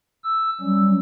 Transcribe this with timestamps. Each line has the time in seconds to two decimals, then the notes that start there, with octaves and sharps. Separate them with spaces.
0.24 E6
0.61 F#3 G3 C#4